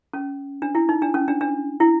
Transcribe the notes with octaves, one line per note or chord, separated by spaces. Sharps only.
C#4
D4
E4
D#4
D4
C#4
D4
D4
E4